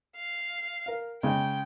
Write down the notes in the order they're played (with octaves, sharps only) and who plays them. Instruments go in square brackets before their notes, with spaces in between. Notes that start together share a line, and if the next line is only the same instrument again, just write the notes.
[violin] F5
[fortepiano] A#4 F5
[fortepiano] C#3 G#3 [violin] G5